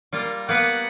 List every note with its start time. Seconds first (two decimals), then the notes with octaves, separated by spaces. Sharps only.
0.13 G3 A#3 F4
0.49 A#3 B3 B4 F#5